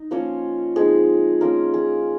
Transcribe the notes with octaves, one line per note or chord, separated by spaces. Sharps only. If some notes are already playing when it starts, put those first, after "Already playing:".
Already playing: D#4
F3 A#3 C#4 F4 C#5
F3 G#3 C4 D#4 G#4
A#3 C#4 F4 A#4
G#4